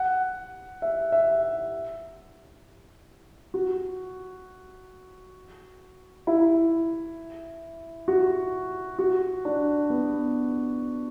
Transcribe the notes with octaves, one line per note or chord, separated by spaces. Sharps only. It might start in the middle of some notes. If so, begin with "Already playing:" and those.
Already playing: F#5
E5
E5
F#4
E4
F#4
F#4
D4
B3